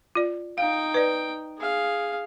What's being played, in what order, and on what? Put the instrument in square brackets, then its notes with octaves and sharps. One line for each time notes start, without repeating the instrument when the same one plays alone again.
[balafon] F4 D5
[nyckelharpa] D#4 G5 [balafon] F5
[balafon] B4 D5
[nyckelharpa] G#4 F5